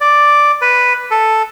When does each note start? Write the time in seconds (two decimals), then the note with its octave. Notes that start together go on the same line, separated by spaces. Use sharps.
0.01 D5
0.62 B4
1.11 A4